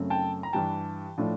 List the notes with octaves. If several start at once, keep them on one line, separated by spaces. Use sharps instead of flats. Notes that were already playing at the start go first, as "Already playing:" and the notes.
Already playing: F#2 C#3 F#3 A3 C4
G5 A5
A#5
G2 E3 G3 G5 A5
A2 F3 A3 D4